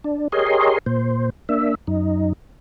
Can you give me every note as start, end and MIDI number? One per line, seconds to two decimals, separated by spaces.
0.04 0.28 62
0.32 0.78 67
0.32 0.78 68
0.32 0.78 70
0.32 0.78 73
0.32 0.78 75
0.32 0.78 84
0.86 1.30 46
0.86 1.30 72
1.49 1.75 58
1.49 1.75 62
1.49 1.75 76
1.87 2.33 42
1.87 2.33 63